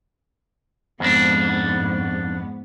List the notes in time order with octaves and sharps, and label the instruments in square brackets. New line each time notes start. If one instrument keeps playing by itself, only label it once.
[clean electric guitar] F2 D4 [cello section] G#2 B3